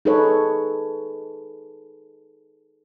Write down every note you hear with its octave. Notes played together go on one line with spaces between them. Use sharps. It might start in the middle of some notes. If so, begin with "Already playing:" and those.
D#4 G#4 A4 B4 C#5